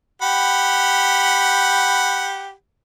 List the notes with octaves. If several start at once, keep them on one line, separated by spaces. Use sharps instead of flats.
G4 F#5 B5